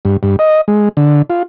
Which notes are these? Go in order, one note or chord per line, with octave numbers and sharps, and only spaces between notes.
G2
G2
D#5
G#3
D3
F4